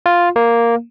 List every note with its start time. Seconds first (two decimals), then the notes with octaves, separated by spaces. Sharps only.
0.06 F4
0.36 A#3